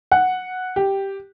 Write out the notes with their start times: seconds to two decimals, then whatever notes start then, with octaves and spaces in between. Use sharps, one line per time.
0.12 F#5
0.76 G4